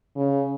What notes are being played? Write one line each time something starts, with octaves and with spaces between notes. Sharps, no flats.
C#3